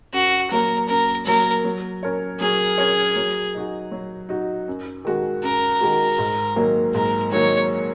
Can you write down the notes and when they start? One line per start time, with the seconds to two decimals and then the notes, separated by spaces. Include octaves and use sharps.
0.13 F#2 F#4
0.51 F#3 A#3 A#4
0.89 F#2 A#4
1.26 F#3 A#3 A#4
1.64 F#3
2.03 C#4 A#4 C#5
2.40 F#3 G#4
2.78 C#4 A#4 C#5
3.16 F#3
3.54 D#4 F#4
3.92 F#3
4.29 D#4 F#4
4.68 F#2
5.05 D#3 G#3 F#4
5.43 F#2 A#4
5.81 D#3 G#3 F#4
6.18 G#2
6.56 D#3 F#3 A#3
6.94 G#2 A#4
7.32 D#3 F#3 A#3 C#5